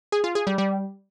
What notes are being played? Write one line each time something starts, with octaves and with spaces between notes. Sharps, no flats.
G#4
F4
G#4
G3
G3